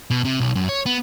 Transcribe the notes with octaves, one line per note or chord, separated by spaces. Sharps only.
B2
C3
B1
F#2
C#5
B3